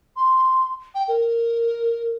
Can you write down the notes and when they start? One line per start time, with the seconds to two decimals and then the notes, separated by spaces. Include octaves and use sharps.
0.16 C6
0.95 G5
1.08 A#4